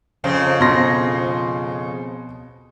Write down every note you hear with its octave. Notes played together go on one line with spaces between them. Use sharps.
F2 C#3 C4
B2 C6 A#6